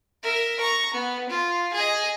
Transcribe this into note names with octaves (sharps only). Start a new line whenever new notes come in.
A#4 E5
A#5 C#6
B3
F4
G#4 D#5